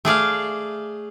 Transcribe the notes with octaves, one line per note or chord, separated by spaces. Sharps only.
A3 G#4 D5 F5